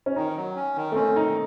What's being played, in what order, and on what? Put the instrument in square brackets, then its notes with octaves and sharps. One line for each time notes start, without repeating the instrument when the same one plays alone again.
[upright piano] C#4
[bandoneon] D#3 [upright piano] D#4
[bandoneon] F#3
C#4
D#3
[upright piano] A3
[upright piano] C4 [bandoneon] C#4
[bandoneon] D#3 [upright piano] D#4